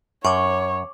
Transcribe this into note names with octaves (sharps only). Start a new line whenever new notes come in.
F#2 C#5 C#6 D6